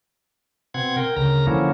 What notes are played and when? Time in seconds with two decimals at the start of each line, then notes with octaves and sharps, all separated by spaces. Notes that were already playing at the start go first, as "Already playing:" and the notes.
0.74 B2 C4 F#5 G#6
0.97 A#4 G5
1.17 D2 C#3 A#4 A#5
1.47 D3 F3 F#3 A#3 C#4 E4